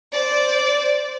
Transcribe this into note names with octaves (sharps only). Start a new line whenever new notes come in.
C5 D5